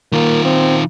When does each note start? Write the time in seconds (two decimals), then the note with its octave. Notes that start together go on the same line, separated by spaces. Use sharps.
0.12 D#3 A#3 F4
0.44 C4